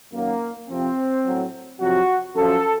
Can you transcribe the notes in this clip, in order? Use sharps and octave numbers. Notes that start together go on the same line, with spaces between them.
F#2 D#3 F#3 A#3
F2 C3 F3 C4
A2 F#3
F2 C3 F#3 F#4
F#2 F3 A4